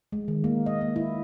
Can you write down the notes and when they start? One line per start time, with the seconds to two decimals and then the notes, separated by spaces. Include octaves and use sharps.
0.12 G#3
0.28 D#3
0.44 A#3
0.66 D#5
0.81 A#3
0.96 E4